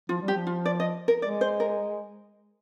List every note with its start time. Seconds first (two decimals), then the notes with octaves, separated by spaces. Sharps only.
0.09 F3 F4
0.22 G3
0.28 G4
0.34 F3
0.47 F4
0.66 D5
0.80 D#5
1.08 A#4
1.22 G#3 D5
1.41 C5
1.60 A#4